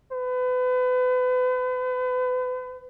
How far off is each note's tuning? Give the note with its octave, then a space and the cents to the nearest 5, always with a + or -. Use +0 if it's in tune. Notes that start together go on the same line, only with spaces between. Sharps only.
B4 +35